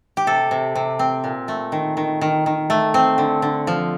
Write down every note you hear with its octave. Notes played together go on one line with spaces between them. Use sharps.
G4
C3 A4
C3
C3
C4
A#2
A3
D#3
D#3
D#3
D#3
A3
C4
D3
D3
F3